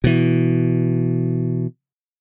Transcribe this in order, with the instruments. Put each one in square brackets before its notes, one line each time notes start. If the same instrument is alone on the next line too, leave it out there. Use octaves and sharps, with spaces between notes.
[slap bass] B2 E3